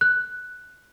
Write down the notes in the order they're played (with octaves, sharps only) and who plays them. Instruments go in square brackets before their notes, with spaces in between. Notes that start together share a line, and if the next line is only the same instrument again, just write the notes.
[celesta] F#6